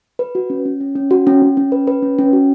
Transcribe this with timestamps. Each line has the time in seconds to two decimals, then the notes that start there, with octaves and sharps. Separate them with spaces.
0.19 B4
0.35 F#4
0.50 C#4
0.65 C#4
0.81 C#4
0.96 C#4
1.11 F#4
1.27 C#4
1.42 C#4
1.57 C#4
1.72 B4
1.87 B4
2.03 C#4
2.19 C#4
2.33 F#4